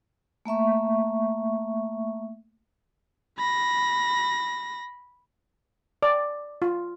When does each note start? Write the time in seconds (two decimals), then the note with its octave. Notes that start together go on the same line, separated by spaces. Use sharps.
0.45 A3 A#3 E5 C#6
3.38 B5 A#6
6.03 D5
6.62 F4